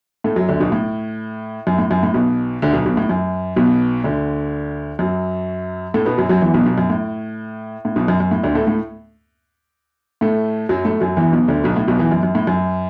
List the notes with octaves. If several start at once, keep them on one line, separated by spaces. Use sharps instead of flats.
A2 A3
F#2 F#3
D2 D3
B1 B2
A2
F#2
A2
F#2
A2
B1 B2
D2 D3
B1 B2
B1 B2
A2
F#2
B1 B2
D2 D3
F#2 F#3
A2 A3
B2 B3
F#2 F#3
F#2 F#3
E2 E3
B1 B2
B1 B2
F#2
A2
A2
B1 B2
F#2
F#2
A2
D2 D3
A2 A3
A2 A3
A2 A3
F#2 F#3
A2 A3
F#2 F#3
E2 E3
B1 B2
D2 D3
B1 B2
A2
B1 B2
E2 E3
F#2
F#2
A2
F#2